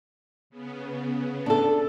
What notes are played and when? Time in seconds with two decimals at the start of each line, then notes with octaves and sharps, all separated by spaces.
0.50 C#3 B3
1.46 D4 A4